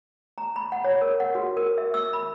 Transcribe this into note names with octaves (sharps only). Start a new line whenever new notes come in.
A#5
B5
F#5
C#5
A#4
F#5
F#4
A#4
E5
E6
B5